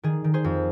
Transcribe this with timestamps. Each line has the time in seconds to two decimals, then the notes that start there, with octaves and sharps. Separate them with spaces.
0.03 D#3 G#4
0.24 D#3
0.34 G#4 C5
0.44 F2